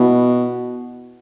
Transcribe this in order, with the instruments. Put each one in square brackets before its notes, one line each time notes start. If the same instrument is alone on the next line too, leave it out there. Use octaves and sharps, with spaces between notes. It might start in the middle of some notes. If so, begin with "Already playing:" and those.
Already playing: [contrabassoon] B2 [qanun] B3 E4